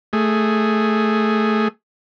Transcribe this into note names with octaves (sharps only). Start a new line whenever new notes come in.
A3 G#4